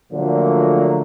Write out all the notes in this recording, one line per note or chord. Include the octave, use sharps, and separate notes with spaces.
A#2 D3 F3 F#3 A3 A#3